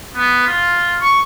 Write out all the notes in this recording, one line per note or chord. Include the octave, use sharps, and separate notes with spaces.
B3
F4
C#6